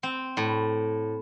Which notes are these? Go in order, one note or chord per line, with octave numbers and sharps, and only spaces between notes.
C4
A2